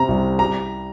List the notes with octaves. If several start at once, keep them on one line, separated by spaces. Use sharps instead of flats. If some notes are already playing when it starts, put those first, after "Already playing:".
Already playing: C3 C4 A#5
C2
G3 A#5